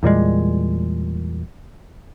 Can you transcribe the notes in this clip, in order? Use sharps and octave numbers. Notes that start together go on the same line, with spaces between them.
E2 A#2 G3 G#3